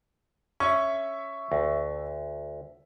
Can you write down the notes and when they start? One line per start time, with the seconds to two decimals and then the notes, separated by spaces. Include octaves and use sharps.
0.60 C#4 E5 C#6
1.52 D2